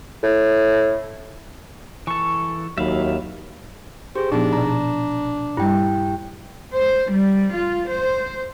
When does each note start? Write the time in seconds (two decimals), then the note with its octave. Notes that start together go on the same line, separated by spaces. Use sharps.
0.23 A2
2.07 E3 A4 C#6
2.78 D#2 F#3 E5 F5 B5
4.16 G4 G#4 C5
4.32 A#2 F3 B3 D4 D#4 G#4
4.53 B2 D5 A#5
5.57 G2 G3 E4 G4 G5
6.74 C5
7.11 G3
7.55 F4
7.88 C5